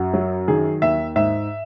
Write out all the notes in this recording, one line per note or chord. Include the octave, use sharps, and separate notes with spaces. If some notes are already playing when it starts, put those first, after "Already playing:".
Already playing: F#2 F#4
F#3
D#3 G#4
D#2 E5
G#2 E5